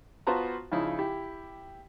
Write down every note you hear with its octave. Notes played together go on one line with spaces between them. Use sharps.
B3 F4 F#4 C5 A5 A#5
C#3 F3 D#4 E4
E4 G4